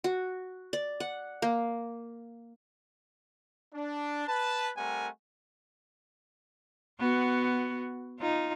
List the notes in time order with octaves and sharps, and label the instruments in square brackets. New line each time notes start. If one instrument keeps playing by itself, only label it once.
[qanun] F#4
D5
F#5
A#3
[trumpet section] D4
B4 A5
G3 A3 C4 A#4 F#5 G#5
[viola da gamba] B3 F#4
D#4 F4